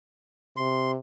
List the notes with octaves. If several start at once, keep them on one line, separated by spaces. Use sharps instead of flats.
C3 C6